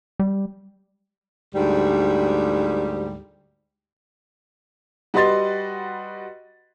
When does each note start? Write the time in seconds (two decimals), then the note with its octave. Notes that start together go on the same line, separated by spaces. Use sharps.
0.20 G3
1.55 D2 G#2 G3
5.14 G3 F#4 B4 D#5 C6 A6